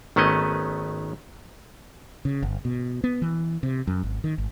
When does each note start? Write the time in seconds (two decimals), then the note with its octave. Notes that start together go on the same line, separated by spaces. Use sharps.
0.16 G#1 D#3 A3 B3 C#4 D#5
2.25 C#3
2.43 G1
2.65 B2
3.04 B3
3.22 E3
3.63 C3
3.87 F#2
4.03 G#1
4.24 D#3
4.38 G#1